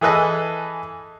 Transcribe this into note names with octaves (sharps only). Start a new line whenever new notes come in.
E3 G#4 A4 B4 D#5